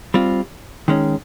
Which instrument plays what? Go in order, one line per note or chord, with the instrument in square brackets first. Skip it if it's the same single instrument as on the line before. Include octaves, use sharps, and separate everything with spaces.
[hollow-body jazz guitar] G3 C4 F4
D#3 G#3 C#4